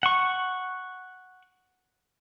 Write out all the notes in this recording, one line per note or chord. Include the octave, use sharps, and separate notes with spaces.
F#5 C#6